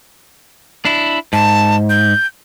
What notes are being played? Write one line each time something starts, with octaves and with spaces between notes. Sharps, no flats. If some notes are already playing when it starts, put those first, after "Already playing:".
D4 E4
G#2 A5
G6